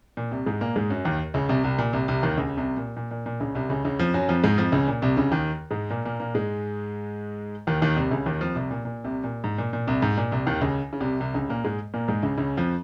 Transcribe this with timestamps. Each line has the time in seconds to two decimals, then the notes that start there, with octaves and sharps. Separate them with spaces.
0.17 A#2
0.31 C2 C3
0.46 G#2 G#3
0.61 A#2 A#3
0.76 G#2 G#3
0.90 F#2 F#3
1.05 D#2 D#3
1.34 C#2 C#3
1.49 C2 C3
1.64 C2 C3
1.78 A#2
1.93 C2 C3
2.08 C2 C3
2.23 D#2 D#3
2.37 C#2 C#3
2.57 C2 C3
2.77 A#2
2.97 A#2
3.11 A#2
3.26 A#2
3.40 C#2 C#3
3.55 C2 C3
3.69 C#2 C#3
3.85 C#2 C#3
3.99 F2 F3
4.14 F#2 F#3
4.29 F2 F3
4.44 G#2 G#3
4.58 F2 F3
4.72 C#2 C#3
4.88 A#2
5.02 C2 C3
5.17 C#2 C#3
5.31 D#2 D#3
5.71 G#2 G#3
5.91 A#2 A#3
6.05 A#2 A#3
6.20 A#2 A#3
6.34 G#2 G#3
7.67 D#2 D#3
7.82 D#2 D#3
7.97 C2 C3
8.11 C#2 C#3
8.26 D#2 D#3
8.41 F2 F3
8.55 C2 C3
8.71 A#2
8.85 A#2
9.04 C2 C3
9.24 A#2
9.44 G#2
9.58 A#2
9.73 A#2
9.87 C2 C3
10.02 G#2
10.17 A#2
10.32 C2 C3
10.47 D#2 D#3
10.61 C#2 C#3
10.93 C#3
11.00 C2 C3
11.20 C2 C3
11.34 C#2 C#3
11.50 A#2 A#3
11.64 G#2 G#3
11.94 A#2 A#3
12.08 G#2 G#3
12.23 C#2 C#3
12.38 C#2 C#3
12.57 F2 F3